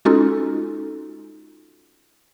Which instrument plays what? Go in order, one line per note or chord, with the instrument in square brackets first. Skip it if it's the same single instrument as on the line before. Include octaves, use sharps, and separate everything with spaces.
[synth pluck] G#3 C#4 D#4 F4 F#4 A4